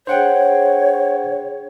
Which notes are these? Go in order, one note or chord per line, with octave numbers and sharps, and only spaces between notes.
D4 G#4 C5 C#5 F#5 G5